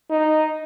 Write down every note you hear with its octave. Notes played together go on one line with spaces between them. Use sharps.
D#4